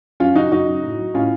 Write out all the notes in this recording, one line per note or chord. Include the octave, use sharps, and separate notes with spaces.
F#2 C#4 F4
C#3 F#3 D#4 F#4
F#2 D#4 F#4
C#3 F#3
A2
F#3
A2 C#4 F4